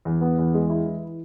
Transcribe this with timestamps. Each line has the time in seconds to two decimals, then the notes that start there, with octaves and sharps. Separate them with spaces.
0.05 E2
0.21 B3
0.38 E2
0.54 G#3
0.70 E4
0.86 E3